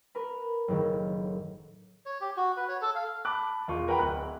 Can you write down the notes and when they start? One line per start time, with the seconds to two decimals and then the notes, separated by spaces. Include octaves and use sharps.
0.15 A#4 B4 B5
0.68 F#1 A2 D#3
2.06 C#5
2.21 G4
2.37 F#4
2.57 B4
2.68 C#5
2.82 A4
2.95 F5
3.25 A5 B5 D6 F#6
3.68 E1 F4 C#6
3.88 A#4 B4 F#5 G5 A#5 B5
3.99 D1 F#6